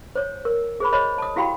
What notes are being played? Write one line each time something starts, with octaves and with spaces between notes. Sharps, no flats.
C5 C#5
A#4
G#4 C5 B5
C5 C#5 D#5 B5
A5 D#6
E4 F#4 G4 F5 G5 B5